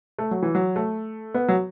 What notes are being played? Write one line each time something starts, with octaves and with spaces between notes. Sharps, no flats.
A3
F#3
E3
F#3
A3
B3
F#3